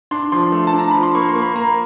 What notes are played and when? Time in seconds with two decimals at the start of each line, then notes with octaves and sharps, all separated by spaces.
0.11 D4 C6
0.32 F3 C6
0.52 A3
0.67 A5
0.73 D4
0.79 A#5
0.91 F3 B5
1.03 C6
1.15 A#3 C#6
1.29 C6
1.35 A#3
1.42 B5
1.56 A#3 A#5